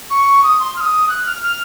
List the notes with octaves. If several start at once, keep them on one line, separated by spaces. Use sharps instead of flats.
C#6
D#6
C6
F6
D#6
F#6
F6
F6